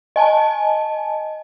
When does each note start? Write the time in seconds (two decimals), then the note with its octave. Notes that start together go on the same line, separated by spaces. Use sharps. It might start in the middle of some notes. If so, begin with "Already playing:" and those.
0.16 D#5 G#5 A5